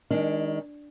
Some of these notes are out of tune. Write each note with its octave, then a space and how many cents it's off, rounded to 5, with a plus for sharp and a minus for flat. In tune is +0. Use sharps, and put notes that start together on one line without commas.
D#3 +20 G#3 -20 D4 +0